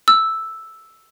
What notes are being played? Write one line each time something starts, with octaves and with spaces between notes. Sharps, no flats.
E6